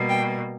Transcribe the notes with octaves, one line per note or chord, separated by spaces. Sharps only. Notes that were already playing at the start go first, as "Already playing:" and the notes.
Already playing: B2 G3 A#3
G5